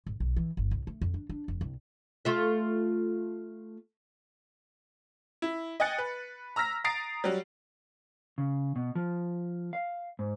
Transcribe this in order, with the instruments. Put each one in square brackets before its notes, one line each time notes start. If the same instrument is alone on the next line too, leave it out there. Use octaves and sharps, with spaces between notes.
[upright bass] G#1
B1
E3
G1
C2
A3
F2
D4
D4
F1
C2
[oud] A3 F4 E5
[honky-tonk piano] E4
D#5 G5 G#5 F#6 A6 C#7
B4
A#5 E6 F6 A#6 B6
A#5 D#6 A6 C7 D7
F#3 G3
[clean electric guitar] C#3
B2
F3
F5
G#2